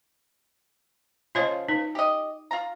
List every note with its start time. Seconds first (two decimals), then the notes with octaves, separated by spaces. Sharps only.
1.35 C#3 F3 F4 C#5 D#5
1.69 D#4 B4
1.95 G4 D#5
2.51 F4 A#5